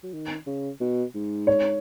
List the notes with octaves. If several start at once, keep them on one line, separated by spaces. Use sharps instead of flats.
F#3
D#3
C#3
B2
G#2
C#5